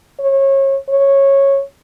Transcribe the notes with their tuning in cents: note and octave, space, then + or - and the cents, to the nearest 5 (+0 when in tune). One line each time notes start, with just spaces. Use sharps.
C#5 -30
C#5 -10